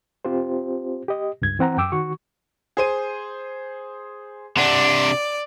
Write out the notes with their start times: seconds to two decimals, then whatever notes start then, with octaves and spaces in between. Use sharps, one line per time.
0.25 C4 F4 G4 C5
1.08 G4 D#5
1.42 C#2 G2 G#6
1.59 E3 C4 F#5 A#5
1.77 F#2 G5 D6 E6
1.92 D#3 F#4 C#6
2.77 G#4 C5 D#7
4.57 C3 D4 D5 F#5